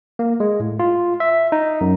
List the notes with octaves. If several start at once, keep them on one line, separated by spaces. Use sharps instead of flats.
A#3
G#3
A2
F4
E5
D#4
F#2